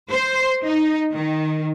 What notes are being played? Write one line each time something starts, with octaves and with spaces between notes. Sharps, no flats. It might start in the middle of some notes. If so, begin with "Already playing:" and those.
C5
D#4
D#3